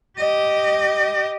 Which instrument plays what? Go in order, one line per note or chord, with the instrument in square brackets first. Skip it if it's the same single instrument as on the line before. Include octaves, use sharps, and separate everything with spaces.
[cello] G4 D#5